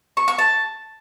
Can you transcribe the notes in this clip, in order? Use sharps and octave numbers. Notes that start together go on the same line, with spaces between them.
C#6
C#6
A5